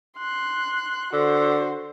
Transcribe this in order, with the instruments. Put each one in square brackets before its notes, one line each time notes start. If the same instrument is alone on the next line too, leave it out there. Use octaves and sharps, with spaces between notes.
[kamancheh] C6 F#6
[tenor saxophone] D3 [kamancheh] F#4 C5